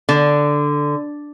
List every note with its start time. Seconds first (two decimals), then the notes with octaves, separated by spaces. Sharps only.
0.09 D3